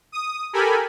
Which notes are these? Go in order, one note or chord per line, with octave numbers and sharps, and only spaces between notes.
D#6
G4 A4 A#4 G#5 B5